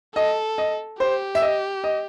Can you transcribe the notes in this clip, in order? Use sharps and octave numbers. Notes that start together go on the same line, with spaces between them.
A4 D#5
D#5
G4 C5
E5
D#5
D#5